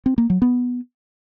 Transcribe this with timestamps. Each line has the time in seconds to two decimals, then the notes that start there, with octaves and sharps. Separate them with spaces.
0.06 C4
0.18 A#3
0.30 F#3
0.42 B3